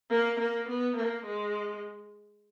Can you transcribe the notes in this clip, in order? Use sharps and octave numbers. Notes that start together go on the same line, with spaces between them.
A#3
A#3
B3
A#3
G#3